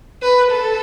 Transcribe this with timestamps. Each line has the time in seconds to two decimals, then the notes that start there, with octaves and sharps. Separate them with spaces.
0.22 B4
0.51 A4